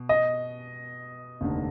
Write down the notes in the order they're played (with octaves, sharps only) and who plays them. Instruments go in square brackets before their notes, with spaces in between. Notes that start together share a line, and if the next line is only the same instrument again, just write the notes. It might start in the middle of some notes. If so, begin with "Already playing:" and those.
Already playing: [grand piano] B2
[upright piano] D#5
[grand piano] F1 D#2 D3